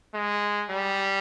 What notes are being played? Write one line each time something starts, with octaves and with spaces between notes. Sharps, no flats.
G#3
G3